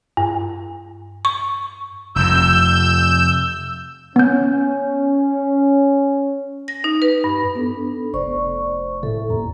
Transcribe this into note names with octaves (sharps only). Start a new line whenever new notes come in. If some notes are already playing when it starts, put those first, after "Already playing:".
G2
C#6
F1 F2 E6 G6
B3 C#4 G6
A#6
D#4
B4
G2
B3 D4 A4
F1 C5 D5 C#6
A2 A4 E5
D#2 A#5